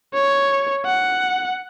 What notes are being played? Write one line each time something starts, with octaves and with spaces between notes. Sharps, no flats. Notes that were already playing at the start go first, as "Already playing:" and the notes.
C#5
F#5